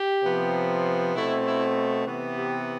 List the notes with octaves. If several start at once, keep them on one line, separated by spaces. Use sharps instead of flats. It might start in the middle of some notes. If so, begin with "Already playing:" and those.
Already playing: G4
C3 F3 B3
B2 A3 C4 E4
E4
C3 E3 B3
G4